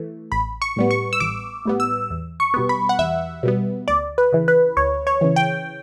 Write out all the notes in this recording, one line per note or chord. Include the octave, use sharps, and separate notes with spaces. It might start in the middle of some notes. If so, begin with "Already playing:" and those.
Already playing: E3 A3
A1 B5
C#6
A2 G3 B3
C#6
E6
A1 D6
A2 G3 B3
E6
E2
C#6
B2 G3 B3
B5
F#5
E2 E5
B2 G3 B3
D2 D5
B4
C#3 E3
B4
D2 C#5
C#5
C#3 E3
G5